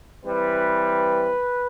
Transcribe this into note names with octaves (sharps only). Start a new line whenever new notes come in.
E3 G3 C4 B4